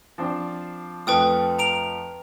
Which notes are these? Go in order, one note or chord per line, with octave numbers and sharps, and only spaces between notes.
F3 C4 D4
F2 F3 A3 B4 G5 D#6
A#5 D7 F7